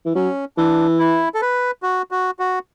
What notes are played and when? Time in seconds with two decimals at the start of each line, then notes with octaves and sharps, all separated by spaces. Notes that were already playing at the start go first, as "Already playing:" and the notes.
0.05 E3
0.15 F#3 C#4
0.57 E3 D4
0.99 E4
1.34 A4
1.42 B4
1.83 F#4
2.11 F#4
2.39 F#4